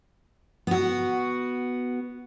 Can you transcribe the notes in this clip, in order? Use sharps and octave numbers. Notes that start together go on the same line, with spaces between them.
B3 F#4